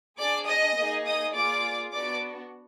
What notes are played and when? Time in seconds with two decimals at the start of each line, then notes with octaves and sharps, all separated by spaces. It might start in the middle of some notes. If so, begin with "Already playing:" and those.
0.19 D4 G#4 D5 D6
0.48 D#5 D#6
0.77 A#3 D#4 G#4
1.06 D#5 D#6
1.34 A#3 F4 G#4 D5 D6
1.93 B3 D4 F#4 D5 D6